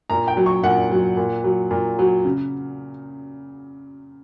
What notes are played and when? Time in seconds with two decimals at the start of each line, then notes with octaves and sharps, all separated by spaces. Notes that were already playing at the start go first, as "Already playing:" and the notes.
0.10 A#2 A#5
0.28 G5
0.37 F#3
0.46 C#6
0.64 A#2 F#5
0.91 F#3
1.17 A#2
1.44 F#3
1.71 A#2
1.99 F#3
2.25 C#3